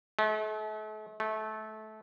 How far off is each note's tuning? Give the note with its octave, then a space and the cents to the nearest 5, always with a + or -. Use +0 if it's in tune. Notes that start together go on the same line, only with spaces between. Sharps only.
A3 -40
A3 -20